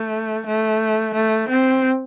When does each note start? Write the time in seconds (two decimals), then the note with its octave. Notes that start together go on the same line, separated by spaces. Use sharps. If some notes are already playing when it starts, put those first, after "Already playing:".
Already playing: A3
0.46 A3
1.14 A3
1.49 C4